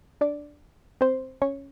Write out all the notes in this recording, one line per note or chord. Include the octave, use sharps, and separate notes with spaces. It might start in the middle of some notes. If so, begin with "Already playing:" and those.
D4 D5
C4 C5
C#4 C#5